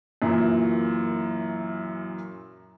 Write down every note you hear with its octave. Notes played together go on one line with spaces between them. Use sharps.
F#2 A#2 E3